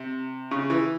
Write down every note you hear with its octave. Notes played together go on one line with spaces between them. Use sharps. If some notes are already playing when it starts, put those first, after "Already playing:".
Already playing: C3
C#3
E3